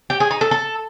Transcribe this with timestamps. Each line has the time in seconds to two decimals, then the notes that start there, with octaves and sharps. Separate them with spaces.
0.10 G4
0.20 G#4
0.31 D#4
0.41 A4
0.51 A4